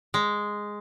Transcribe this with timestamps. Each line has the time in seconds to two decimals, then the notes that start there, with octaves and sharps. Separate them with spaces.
0.14 G#3